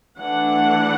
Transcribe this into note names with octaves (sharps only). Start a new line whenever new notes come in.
E3 A3 D4 F#5